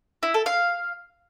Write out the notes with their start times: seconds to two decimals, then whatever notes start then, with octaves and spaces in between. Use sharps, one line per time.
0.23 E4
0.34 A4
0.46 F5